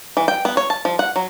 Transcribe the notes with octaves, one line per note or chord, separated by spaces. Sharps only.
E3
G5
B3
C#5
A5
F3
F#5
F#3